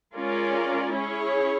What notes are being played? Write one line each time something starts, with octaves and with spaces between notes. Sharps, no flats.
G#3 C#4 F4 A#4 D5
C#4 E4 G#4 C#5